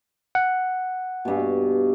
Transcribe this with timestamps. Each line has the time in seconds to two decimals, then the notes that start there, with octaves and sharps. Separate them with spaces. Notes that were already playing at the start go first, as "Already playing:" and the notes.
0.35 F#5
1.25 G2 B2